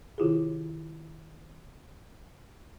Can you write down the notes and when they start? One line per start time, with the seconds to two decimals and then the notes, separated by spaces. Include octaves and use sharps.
0.18 C3 D#3 E4 F4 G4 G#4